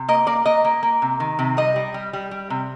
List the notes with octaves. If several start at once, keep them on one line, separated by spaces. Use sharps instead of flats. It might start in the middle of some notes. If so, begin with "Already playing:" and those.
Already playing: C3
A#3 D#5
A#3 D5
A#3 D#5
A#3
A#3
C3
D#3
C3
G3 D#5
G3
G3
G3
G3
C3